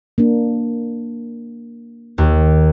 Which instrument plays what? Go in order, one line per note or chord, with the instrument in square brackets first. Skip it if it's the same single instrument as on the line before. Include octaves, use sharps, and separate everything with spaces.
[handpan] A#3 D4
[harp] D#2